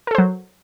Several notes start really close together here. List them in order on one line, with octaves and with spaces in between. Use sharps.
A#4 A4 C5 F#3